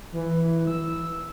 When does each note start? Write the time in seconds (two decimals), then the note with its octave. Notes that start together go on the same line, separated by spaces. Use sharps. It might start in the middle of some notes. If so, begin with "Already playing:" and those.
0.12 E3
0.67 E6